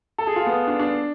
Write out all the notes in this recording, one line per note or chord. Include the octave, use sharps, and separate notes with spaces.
A4
G#4
F4
B3
D4
D4